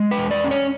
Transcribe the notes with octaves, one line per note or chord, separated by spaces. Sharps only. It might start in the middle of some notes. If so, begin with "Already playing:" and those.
Already playing: G#3
B4
E2
D5
C#4
C#5